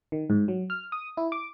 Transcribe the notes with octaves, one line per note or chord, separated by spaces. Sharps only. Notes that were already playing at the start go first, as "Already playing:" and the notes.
D#3
G#2
F#3
F6
D#6
E4
D6